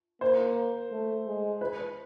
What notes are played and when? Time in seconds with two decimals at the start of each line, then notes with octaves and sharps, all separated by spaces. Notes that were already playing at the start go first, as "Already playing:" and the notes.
0.21 A#3 C5
0.91 A3
1.26 G#3
1.61 B4